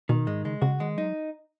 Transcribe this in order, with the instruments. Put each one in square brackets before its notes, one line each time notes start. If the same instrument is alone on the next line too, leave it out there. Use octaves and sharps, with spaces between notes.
[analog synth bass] B2 [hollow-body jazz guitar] D#3
[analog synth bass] G#2 [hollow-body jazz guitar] G#3
[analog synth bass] C#3 [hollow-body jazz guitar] G#3
[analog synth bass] C#3 [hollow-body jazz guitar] F#4
[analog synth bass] D#3 [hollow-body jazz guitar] G#3
[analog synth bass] F#3 [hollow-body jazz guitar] D#4